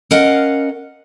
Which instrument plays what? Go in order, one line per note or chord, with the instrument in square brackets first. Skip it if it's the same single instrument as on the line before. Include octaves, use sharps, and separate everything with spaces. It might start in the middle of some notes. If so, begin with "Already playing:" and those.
[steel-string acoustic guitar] C#4 A#4 D#5 F5 F#5